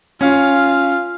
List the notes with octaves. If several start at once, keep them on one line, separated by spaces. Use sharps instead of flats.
C#4 F4 F5